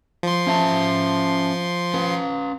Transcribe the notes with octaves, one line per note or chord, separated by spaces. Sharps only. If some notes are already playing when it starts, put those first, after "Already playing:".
F3 C6
C#4 E5 A5
C#4 B4